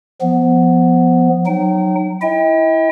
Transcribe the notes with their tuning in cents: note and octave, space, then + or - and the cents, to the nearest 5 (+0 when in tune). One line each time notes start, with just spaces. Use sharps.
F3 +0 B3 +0
F#3 +0 D#4 -20 G5 -40
E4 +0 D#5 +45 G5 +25